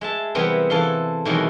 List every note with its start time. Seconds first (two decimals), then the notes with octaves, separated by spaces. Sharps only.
0.01 G#3 E5 A5
0.35 C3 E3 G3 B3 C4 A#4
0.70 E3 A4 F5 C6
1.25 B2 D#3 E3 F#3 G#3 A3